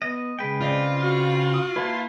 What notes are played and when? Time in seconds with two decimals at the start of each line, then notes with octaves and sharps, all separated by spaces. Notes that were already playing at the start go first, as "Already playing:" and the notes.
0.02 B3 D#5
0.39 C#3 G#3 B4 G5
0.61 C4 F4 D5 D#5
1.03 F#4
1.54 D#6
1.76 A#3 E4 B4 A5